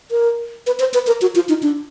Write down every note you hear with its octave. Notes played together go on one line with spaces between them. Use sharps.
A#4
B4
C5
B4
A#4
F#4
F4
D#4
D4